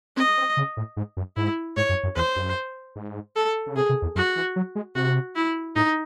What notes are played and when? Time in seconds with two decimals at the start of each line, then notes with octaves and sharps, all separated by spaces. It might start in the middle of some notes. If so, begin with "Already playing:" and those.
0.16 C4 D#5
0.37 C4
0.57 C#3
0.77 A2
0.97 G#2
1.17 F#2
1.36 G#2 E4
1.76 G#2 C#5
1.89 F#2
2.03 F#2
2.16 E2 C5
2.36 F#2
2.96 G#2
3.36 A4
3.67 C#3
3.76 C3 G#4
3.89 C3
4.02 E2
4.15 F#2 F#4
4.36 E3
4.56 F#3
4.75 G#3
4.95 C3 F#4
5.35 E4
5.75 A2 D#4